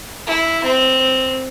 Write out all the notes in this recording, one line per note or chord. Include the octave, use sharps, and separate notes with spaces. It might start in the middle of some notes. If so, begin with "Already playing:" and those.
E4
C4